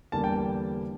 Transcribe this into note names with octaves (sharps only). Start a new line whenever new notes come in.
E2 D3 G3 A#3 A5
G5